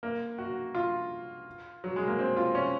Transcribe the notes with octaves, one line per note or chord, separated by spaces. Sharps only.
A#3
F#4
F4
F#3
G#3
A#3
C4
F4
C#4